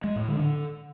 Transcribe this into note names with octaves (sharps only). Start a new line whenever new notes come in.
G#3
A2
D3
D3